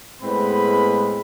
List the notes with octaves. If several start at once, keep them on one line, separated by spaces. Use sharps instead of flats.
A2 G#3 B3 C4 B4 B5